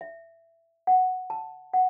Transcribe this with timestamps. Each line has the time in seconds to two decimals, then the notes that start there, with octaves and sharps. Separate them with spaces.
0.01 E5
0.87 F#5
1.30 A5
1.73 F#5